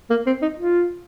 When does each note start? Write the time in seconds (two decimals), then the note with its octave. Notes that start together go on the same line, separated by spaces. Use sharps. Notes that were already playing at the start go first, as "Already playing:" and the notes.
0.10 A#3
0.26 C4
0.42 D#4
0.58 F4